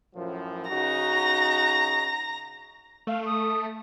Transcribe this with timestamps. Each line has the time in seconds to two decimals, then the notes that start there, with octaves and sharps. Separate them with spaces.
0.15 F#2 A2 F3
0.70 C#3 D#4 F#4 A#5 A#6
3.07 A3 F5
3.26 D#6